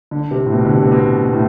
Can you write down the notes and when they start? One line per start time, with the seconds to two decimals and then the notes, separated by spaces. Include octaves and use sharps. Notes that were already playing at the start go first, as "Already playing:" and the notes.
0.11 D3
0.31 C3
0.46 A2
0.52 B2
0.65 D3
0.73 C3
0.83 C3
0.92 B2
1.25 B2
1.33 A2